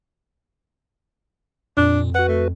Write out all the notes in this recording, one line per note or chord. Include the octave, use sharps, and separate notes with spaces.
F2 A#2 D4
F#4 B4 F#5
A3